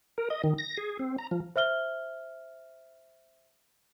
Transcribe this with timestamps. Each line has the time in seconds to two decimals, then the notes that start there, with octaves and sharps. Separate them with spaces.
0.18 A#4
0.30 D#5
0.44 D#3
0.58 A#6
0.77 G#4
0.99 C4
1.18 A#5
1.31 F3
1.56 C5 E5 F6 G7